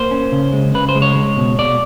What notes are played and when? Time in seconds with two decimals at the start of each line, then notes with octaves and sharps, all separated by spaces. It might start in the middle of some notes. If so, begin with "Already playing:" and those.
Already playing: A#3 C5
0.11 C#4
0.32 C#3
0.53 G#3
0.74 C#3 B4
0.89 C5
0.95 G#3
1.02 C#5
1.16 G#3
1.37 B2
1.59 B2 D5